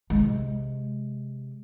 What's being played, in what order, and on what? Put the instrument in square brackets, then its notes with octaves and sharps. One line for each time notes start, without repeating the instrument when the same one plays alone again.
[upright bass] C3 G#3